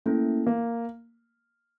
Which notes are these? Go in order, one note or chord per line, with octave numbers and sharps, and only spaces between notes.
A3 A#3 C#4 E4
A#3